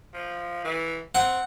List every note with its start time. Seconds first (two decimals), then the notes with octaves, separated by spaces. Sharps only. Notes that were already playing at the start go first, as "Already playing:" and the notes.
0.14 F3
0.65 E3
1.15 C4 F#5